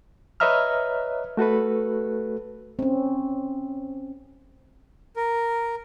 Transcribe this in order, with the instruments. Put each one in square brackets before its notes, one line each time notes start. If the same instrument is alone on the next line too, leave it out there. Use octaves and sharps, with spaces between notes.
[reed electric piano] B4 C#5 D#5 E5 A#5 F6
A3 F#4 A4 B4
[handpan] C4 C#4
[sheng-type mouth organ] A#4